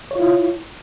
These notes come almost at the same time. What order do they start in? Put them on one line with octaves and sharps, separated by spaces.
C#5 F4 E4